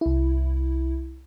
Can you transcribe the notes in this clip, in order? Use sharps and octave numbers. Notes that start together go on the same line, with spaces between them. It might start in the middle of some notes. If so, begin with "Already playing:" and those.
C2 E4